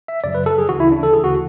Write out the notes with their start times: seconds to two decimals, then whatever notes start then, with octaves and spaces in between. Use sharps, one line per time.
0.08 E5
0.24 F#2 C#3 F#3 D5
0.35 B4
0.46 A4
0.58 G#4
0.69 D2 C#3 E3 F#4
0.80 E4
0.92 D4
1.03 A4
1.13 D2 C#3 E3 G#4
1.24 F#4